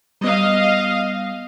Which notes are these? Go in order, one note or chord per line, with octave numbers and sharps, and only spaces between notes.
G3 B3 D#5 F5